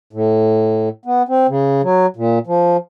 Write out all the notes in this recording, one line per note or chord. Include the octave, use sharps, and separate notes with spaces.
A2
B3
C4
C#3
F#3
A#2
F3